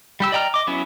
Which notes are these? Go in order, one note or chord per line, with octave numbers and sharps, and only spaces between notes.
G3 G4 E6
D5 D#5 G5 A#5 F6
D#5 D6
F#3 B3 C#4 E4